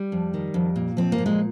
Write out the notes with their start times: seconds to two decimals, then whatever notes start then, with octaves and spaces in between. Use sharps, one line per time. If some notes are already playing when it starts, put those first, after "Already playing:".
Already playing: G3
0.12 F2
0.34 D#3
0.54 F2
0.76 A#2
0.97 F3 C4
1.12 A#3
1.18 A#2
1.26 G#3